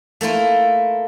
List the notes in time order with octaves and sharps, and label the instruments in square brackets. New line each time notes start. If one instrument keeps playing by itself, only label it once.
[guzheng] A3 A#3 E4 F4